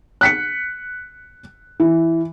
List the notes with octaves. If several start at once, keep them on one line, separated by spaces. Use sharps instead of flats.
F#6 B6 C#7
E3